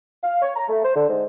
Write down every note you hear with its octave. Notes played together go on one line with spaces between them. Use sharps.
F5
C#5
A#5
A3
C5
D3
G#2